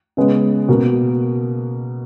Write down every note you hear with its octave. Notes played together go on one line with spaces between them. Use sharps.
C#3 G#3 B3
B2 A#3